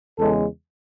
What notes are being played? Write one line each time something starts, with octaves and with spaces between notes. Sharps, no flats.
E2 C#3 G#3 A4